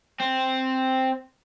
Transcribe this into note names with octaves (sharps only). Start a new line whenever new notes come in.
C4